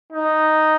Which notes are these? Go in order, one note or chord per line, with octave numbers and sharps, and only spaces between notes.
D#4